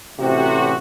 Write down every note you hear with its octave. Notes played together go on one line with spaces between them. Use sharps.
A1 C3 F#4